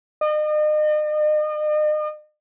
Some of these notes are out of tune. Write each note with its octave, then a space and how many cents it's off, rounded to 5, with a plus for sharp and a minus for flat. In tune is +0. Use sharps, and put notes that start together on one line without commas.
D#5 -40